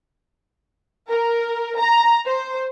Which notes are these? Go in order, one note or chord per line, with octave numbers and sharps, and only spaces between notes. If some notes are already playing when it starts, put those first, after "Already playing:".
A#4
A#5
C5